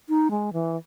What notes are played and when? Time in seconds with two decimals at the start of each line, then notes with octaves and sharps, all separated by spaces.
0.09 D#4
0.31 G#3
0.53 E3